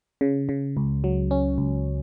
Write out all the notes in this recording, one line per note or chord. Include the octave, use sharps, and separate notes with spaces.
C#3
C#3
C#2
F#3
C#4
C#2